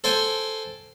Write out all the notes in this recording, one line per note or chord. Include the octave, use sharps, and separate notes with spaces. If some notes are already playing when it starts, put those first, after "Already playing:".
A4 C5 G5 G#5